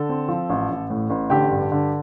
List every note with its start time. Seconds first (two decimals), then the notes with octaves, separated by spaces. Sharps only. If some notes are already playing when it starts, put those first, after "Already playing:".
Already playing: D3 A4
0.09 C4
0.28 F3
0.50 A1
0.70 A1
0.90 A2
1.10 A1
1.30 D3 G4 G5
1.51 G2
1.72 D3